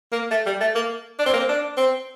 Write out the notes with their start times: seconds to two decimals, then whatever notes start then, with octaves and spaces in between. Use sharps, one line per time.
0.12 A#3
0.31 A3
0.46 G3
0.61 A3
0.75 A#3
1.19 D4
1.26 C4
1.33 A#3
1.40 C4
1.49 D4
1.77 C4